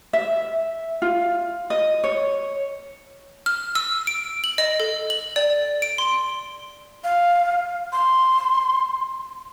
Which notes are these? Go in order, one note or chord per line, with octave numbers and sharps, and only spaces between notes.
E5
F4
D#5
C#5
F6
E6
D7
F#7
D#5
A4
F#7
D5
D7
C6
F5
C6